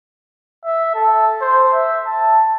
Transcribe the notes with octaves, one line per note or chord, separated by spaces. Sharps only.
E5
A4
C5
E5
A5